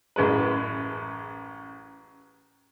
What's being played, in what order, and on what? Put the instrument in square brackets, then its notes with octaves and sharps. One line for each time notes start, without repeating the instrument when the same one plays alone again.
[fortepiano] A1 F#2 G#3 B4